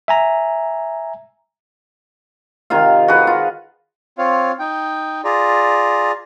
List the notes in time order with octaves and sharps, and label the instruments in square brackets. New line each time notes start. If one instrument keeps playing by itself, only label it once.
[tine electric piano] E5 G#5 A#5
[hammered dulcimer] C3 D#3 F4 F5
F#4 G#4 B4
F4
[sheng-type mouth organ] C4 F4 C#5 F5
D#4 G5
F4 G#4 D5 A#5